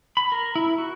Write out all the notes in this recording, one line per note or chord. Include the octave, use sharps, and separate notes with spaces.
B5
A#4
E4
F#4